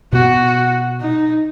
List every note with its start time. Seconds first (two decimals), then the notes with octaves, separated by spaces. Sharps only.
0.13 B2 B3 F#4
1.01 D#4